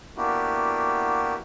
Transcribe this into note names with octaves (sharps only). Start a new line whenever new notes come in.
A#3 B3 D4 E4 F#4 G4